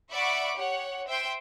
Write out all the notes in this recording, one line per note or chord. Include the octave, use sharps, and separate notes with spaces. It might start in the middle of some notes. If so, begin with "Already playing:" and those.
D5 E5 F#5 B5 C#6 D6
G4 C#5 F#5
C5 E5 G5 C6